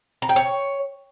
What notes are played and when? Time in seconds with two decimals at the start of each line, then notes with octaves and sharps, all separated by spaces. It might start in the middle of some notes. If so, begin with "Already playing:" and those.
0.22 A#5
0.29 G5
0.36 C#5